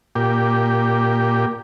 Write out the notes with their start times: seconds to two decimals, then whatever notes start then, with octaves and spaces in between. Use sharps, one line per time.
0.15 A#2 G4